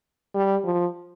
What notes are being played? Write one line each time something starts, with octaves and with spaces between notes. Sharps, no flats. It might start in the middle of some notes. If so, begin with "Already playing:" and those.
G3
F3